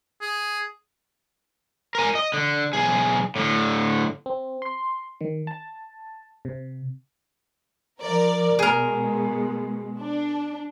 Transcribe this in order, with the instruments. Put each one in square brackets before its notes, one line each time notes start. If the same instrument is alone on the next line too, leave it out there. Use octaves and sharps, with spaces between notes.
[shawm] G#4
[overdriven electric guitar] A#4 G#5
D#5
D3
B1 G#4
A2 D3
[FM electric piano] C4
C6
D#3
A5
C3
[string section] F3 A#4 D5
[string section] B2 G#3 [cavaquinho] G#4 A#4
[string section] D4